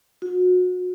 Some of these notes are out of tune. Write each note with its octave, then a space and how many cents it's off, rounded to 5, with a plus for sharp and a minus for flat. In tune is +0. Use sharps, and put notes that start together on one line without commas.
F#4 -30